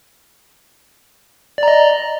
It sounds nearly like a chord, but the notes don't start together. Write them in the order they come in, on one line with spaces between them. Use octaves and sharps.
D5 A#5 D#5